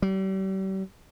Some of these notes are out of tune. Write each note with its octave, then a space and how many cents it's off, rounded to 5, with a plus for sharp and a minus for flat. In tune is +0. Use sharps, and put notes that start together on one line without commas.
G3 -40